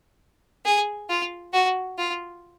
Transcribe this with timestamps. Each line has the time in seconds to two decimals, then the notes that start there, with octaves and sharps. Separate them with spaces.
0.65 G#4
1.09 F4
1.53 F#4
1.98 F4